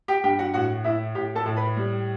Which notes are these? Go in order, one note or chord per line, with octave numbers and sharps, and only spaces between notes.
G4 G5
G2 G4 G5
F#4 F#5
A2 F#4 F#5
A2 E4 E5
A2 G4 G5
A4 A5
A2
B4 B5
G3